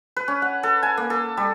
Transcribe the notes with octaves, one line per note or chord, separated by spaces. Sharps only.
B4
C#4
F#5
A4
G#5
A#3
A4
G3